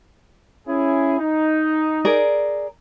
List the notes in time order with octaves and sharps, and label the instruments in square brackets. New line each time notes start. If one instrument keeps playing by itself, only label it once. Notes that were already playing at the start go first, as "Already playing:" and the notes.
[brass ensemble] C#4 E4 G#4
D#4
[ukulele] G#4 A#4 D5